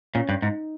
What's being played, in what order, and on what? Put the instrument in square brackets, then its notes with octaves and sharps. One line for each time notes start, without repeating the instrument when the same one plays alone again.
[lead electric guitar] A#2 [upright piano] C#4
[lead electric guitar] G2
[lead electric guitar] G#2 [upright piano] D#4